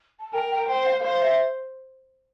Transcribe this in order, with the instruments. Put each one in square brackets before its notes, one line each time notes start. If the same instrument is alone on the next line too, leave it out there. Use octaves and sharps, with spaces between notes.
[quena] A5
[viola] A#4 [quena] G5
[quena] G5
[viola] C5 [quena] G5
[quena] F5
[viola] C5 [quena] F5
[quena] E5